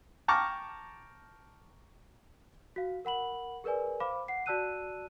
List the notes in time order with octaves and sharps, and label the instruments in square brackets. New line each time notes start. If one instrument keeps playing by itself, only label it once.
[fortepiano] G5 A5 A#5 C#6 D6 F6
[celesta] F#4 F5
A#4 F#5 B5 F#7
G#4 A#4 B4 D5 G#5
C5 F5 B5 D6
F#5 C7
F#4 D5 A5 E6 F#6 D#7